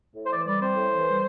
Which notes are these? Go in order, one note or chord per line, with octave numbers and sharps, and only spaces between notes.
A2
C5
E3 D5
G3 D5
C4 C5
A2
E3
G3